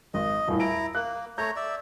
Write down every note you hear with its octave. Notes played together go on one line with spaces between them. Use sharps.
G#1 D#5
D#1 A2
E4 A#5 D7
A#3 F#6
A3 C#5 A#5 G6
D5 E5